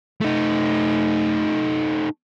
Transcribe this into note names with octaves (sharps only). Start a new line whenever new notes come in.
A3 D#4